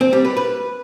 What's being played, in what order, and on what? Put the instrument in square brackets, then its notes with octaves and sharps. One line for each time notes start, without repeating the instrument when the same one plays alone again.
[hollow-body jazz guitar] C4
G3
B4
B4